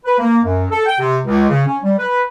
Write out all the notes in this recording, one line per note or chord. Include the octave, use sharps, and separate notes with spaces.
B4
A#3
F#2
A4
G5
C3
C#2
C#3
C#4
G3
B4